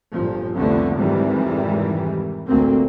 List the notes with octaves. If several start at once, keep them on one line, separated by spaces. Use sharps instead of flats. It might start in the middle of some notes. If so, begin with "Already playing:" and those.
G1 A#2 F3
C2 F2 D3 F3 A3 B3
F2 G#2 C3 D#3 E3 G3
A1 D2 A#2 A#3 C4